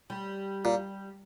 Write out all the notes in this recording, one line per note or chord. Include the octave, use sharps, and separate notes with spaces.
G3
A#2